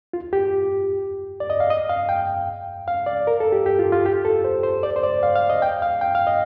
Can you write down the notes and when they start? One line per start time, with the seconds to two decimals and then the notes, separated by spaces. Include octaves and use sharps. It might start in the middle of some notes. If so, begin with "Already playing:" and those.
0.13 F4
0.33 G4
1.40 D5
1.50 D#5
1.60 F5
1.70 D#5
1.90 F5
2.09 G5
2.88 F5
3.07 D5
3.27 A#4
3.40 A4
3.52 G4
3.66 G4
3.79 F4
3.92 F4
4.05 G4
4.25 A4
4.44 C5
4.63 C5
4.83 D5
4.96 C5
5.03 D5
5.23 F5
5.36 F5
5.50 D#5
5.62 G5
5.82 F5
6.01 G5
6.15 F5
6.27 D#5